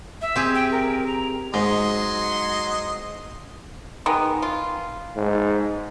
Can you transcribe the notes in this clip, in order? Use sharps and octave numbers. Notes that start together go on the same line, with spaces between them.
E5
C4 G4 G#4
G5
A#4
A#5
G#2 F#3 D#5 C6
D#3 G#3 B3
F4
G#2